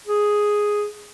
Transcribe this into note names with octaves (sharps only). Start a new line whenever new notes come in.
G#4